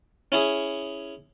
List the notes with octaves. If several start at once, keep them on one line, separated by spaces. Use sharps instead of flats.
C#4 E4 G#4